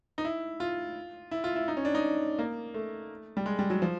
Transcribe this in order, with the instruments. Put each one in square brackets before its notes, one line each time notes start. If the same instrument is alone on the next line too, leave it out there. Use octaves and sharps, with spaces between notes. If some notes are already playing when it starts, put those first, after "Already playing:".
[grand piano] D#4
E4
F4
E4
F4
E4
D#4
C#4
D4
D#4
A#3
A3
G3
G#3
G3
F#3
F3